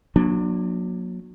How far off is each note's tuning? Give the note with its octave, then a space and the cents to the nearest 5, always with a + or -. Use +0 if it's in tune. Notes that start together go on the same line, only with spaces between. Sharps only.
F#3 -25 A#3 +30 D4 +15